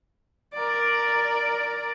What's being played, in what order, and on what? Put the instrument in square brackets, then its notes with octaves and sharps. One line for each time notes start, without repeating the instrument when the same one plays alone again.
[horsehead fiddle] A#4 D5